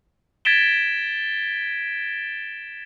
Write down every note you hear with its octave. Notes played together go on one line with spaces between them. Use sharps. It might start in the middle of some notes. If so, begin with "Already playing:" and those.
G#6 A6 B6 D7 E7 G7